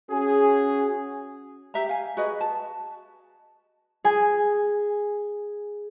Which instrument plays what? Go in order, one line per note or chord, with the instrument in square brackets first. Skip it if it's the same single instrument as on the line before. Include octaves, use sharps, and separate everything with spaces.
[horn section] C#4 F#4 G#4
[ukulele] G4 E5 A#5
F5 G#5
F#4 G#4 B4 D#5
A5
[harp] G#4 G#5